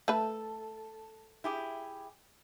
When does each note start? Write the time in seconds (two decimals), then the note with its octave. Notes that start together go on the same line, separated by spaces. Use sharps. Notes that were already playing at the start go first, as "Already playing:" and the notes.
0.08 A3 A4 B4
1.44 E4 G4 G#4